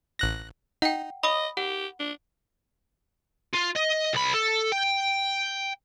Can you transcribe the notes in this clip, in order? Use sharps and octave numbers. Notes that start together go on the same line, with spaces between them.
A1 F#6 A#6
D#4 F#5 G5
D#5 B5 D#6
G4 F#5
D4
F4
D#5
C2 B5
A4
G5